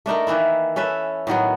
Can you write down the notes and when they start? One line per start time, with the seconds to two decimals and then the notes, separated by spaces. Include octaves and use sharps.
0.06 A3 D4 D#4 A#4
0.27 D#3 E3 A#3 E4
0.76 C#4 A4 B4 E5
1.27 A2 D#3 F#3 B3